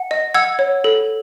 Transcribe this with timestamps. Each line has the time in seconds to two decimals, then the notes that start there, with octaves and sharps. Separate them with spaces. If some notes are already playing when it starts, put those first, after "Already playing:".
Already playing: F#5
0.11 D#5
0.34 F#5 E6 G#6
0.59 C#5
0.84 A4